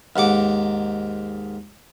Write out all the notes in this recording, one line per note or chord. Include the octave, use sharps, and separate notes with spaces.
D#2 G#2 F#5 D6